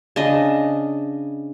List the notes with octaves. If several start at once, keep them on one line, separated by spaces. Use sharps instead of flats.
C#3 D4 D#5